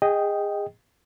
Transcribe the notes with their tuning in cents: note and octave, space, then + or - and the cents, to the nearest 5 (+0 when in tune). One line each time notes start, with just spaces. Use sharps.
G#4 -25 D#5 +0 G5 -5